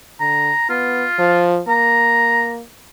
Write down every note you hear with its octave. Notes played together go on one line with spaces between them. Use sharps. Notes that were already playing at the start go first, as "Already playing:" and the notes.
D3 A#5
B3 F4
F3
A#3 A#5